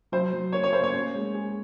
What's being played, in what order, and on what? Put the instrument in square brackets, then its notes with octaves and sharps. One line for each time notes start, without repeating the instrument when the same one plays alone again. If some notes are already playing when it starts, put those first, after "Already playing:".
[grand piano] F#3 [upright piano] C5
[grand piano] F#3
[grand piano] A#3 [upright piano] C#5
[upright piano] C#5
[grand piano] A#3 [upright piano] C5
[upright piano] C#5
[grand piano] C#4
G#3
G#4